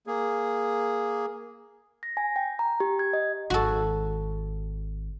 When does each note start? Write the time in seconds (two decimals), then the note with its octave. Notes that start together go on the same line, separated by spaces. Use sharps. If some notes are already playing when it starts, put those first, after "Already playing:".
0.07 A#3 G#4
2.03 A#6
2.17 G#5
2.36 G5
2.59 A#5
2.80 G4
2.99 G#6
3.13 D#5
3.50 G#1 F#4 A4